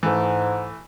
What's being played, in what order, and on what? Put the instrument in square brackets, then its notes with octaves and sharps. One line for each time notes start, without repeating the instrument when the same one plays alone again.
[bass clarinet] G#2 [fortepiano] E3 A3